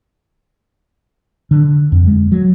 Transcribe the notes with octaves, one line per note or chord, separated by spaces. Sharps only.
D3
F2
G#3
F#3